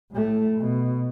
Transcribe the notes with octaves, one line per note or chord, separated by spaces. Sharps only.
A2 A3
B2